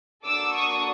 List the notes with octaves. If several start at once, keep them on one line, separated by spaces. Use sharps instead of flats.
A#3 D4 F#4 A4 D6 E6
C#6 D#6